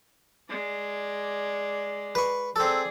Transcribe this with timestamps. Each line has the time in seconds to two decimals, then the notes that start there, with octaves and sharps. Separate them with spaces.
0.49 G#3 D5
2.15 B4 C#6
2.56 C4 G#4 A4 D5